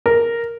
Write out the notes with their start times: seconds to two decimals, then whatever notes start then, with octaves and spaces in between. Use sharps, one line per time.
0.06 A#4